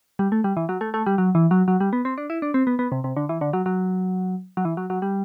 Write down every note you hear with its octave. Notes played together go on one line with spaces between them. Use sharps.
G3
A3
G3
E3
F#3
A3
A3
G3
F#3
E3
F#3
F#3
G3
B3
C4
D4
E4
D4
C4
B3
B3
C3
C3
D3
E3
D3
F#3
F#3
F#3
E3
F#3
F#3
G3